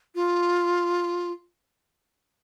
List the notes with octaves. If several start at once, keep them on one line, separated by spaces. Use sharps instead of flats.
F4